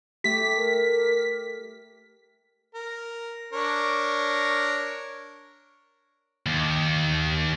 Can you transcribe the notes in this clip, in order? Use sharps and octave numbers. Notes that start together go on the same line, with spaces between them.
A3 G4 B6
A#4
A#4
D4 A#4 C#5
D#2